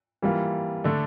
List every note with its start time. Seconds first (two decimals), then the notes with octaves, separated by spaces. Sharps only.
0.22 E3 G3 A#3 F4
0.84 D3 A3 D4